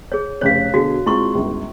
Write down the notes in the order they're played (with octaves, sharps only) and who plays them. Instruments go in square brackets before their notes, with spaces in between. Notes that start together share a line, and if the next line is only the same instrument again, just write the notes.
[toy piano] G#4 C#5
[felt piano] F1 C#3 F#6 [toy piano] C#5 F5
[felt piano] B2 D3 G#4 [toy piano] F#4
[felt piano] G#3 C4 F4 [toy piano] E4 C6 C#6
[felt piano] G1 C#2